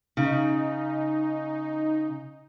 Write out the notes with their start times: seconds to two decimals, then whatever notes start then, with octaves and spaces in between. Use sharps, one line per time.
0.17 C#3 D#4